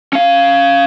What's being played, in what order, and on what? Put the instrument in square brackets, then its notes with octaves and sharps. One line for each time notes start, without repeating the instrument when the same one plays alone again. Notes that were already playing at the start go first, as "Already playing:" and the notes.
[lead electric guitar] C#4 F5